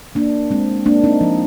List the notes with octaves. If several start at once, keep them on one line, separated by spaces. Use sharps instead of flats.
A#3 D4
G#3 C4
A#3 D4
C4 D#4
F3